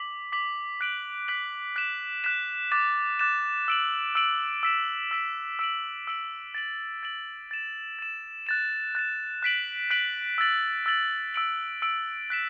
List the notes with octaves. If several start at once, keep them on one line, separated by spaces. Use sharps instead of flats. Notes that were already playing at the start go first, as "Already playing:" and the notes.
Already playing: D6 B6 F#7
D6 B6 F#7
F#6 B6 D7 F#7
F#6 B6 D7 F#7
F#6 B6 E7
F#6 B6 E7
D6 F#6 A6 E7
D6 F#6 A6 E7
E6 D7 F#7
E6 D7 F#7
E6 B6 E7
E6 B6 E7
E6 D7 F#7
E6 D7 F#7
A6 D7 F#7
A6 D7 F#7
A6 E7
A6 E7
F#6 A6 E7
F#6 A6 E7
F#6 B6 D7 F#7
F#6 B6 D7 F#7
E6 A6 F#7
E6 A6 F#7
E6 D7 F#7
E6 D7 F#7
F#6 B6 E7